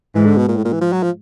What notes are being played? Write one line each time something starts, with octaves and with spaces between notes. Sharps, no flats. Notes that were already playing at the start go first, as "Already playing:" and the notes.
G#2 E3
D3
B2
A#2
A2
A#2
E3
F3
F#3
F3